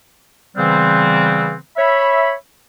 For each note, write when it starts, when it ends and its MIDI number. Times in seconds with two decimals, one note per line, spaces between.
0.57 1.55 49
0.57 1.55 52
0.57 1.55 55
0.57 1.55 59
0.57 1.55 60
1.77 2.33 73
1.77 2.33 76
1.77 2.33 83